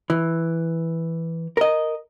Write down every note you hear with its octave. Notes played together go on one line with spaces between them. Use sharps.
E3
A#4 D#5